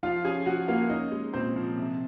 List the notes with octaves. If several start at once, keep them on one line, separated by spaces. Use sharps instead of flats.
F3 F4 F5
C#4 G#4 G#5
F3 F#4 F#5
A#3 F4 F5
C#4 D#4 D#5
G#3
A#2 C4 C5
F3
C3